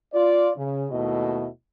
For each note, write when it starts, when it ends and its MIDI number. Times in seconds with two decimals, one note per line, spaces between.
0.14 0.51 65
0.14 0.51 74
0.57 0.87 49
0.91 1.47 39
0.91 1.47 47
0.91 1.47 57
0.91 1.47 64
0.91 1.47 75